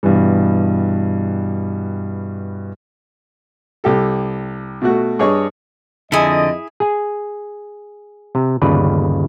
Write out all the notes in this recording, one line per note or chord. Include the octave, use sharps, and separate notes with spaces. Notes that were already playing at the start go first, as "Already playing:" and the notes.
G2 B2 E3 G3
C2 G4 A4
B2 A3 F#4
G2 G#4 C#5 D#5 C#6
F2 D3 E4 G#4 D#5
G#4 G#5
C3
G1 D#2 C#3 B4 D5